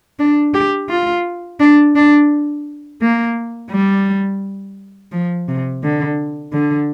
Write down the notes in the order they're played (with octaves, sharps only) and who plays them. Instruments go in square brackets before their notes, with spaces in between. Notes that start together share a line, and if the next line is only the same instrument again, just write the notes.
[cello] D4
G4
F4
D4
D4
A#3
G3
F3
C3
D3
D3